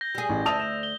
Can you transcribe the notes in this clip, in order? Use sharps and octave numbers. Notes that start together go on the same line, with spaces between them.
G6 A#6 G7
G3 G#4
A1
D2 D5 E5 A5 D#6 F7
E7
G7